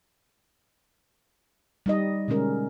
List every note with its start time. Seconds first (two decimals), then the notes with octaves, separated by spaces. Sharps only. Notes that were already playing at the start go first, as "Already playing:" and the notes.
1.86 G3 D#4 D#5
2.28 B2 D3 G#3 C#4 A#4